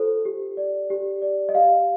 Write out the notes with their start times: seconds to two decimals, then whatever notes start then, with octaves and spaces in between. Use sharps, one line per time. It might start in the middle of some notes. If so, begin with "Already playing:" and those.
Already playing: F4 A4 C5
0.25 G4
0.57 D5
0.90 G4
1.22 D5
1.49 D#5
1.55 G4 F5